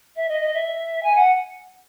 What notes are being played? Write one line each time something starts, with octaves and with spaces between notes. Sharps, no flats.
E5
D#5
D#5
E5
G#5
F#5